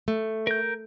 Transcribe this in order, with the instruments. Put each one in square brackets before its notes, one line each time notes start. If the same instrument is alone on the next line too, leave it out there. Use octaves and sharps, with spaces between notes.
[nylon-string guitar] A3
[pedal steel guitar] A#4 G6